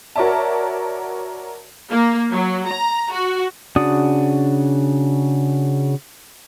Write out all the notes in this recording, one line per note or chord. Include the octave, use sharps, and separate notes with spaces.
F#4 A#4 C#5 D5 E5 A5
A#3
F#3
A#5
F#4
C#3 D4 F#4 D5 D#6